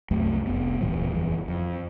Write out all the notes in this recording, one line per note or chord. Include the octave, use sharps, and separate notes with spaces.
C2 F#2 A3
F1 B3
D1 A#2 E3 G3
F#1 E2 E3
F2